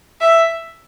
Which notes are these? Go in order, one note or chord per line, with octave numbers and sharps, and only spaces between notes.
E5